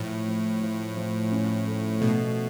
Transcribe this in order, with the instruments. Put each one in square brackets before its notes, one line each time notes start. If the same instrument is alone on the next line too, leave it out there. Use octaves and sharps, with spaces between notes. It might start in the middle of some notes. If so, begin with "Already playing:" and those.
Already playing: [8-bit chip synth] A2 [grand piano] F3
[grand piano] F3
F3
F3
C#4
A3
[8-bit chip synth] B2 [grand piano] A3